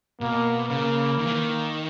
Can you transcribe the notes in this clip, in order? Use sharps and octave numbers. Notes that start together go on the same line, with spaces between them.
B2 A#3
C#3 A#3
D#3
E3
D#3